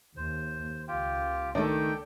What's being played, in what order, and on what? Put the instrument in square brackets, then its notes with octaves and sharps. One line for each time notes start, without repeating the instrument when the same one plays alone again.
[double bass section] D#2 [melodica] C5
[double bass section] C#2 [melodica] F4 G4 G5
[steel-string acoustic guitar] D#3 A3 [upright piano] D4 A4 [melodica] G5